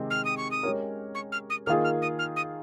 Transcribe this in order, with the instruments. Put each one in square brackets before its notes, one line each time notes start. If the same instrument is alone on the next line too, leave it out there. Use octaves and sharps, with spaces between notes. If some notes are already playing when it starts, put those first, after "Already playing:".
Already playing: [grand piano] C3 D#3 G#3 C4 G4
[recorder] F6
D#6
C#6
D#6
[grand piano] G#3 C#4 G4 A#4 C#5
[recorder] C#6
F6
D#6
[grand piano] D#3 A#3 F4 G#4 [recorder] F6
[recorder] F6
D#6
F6
D#6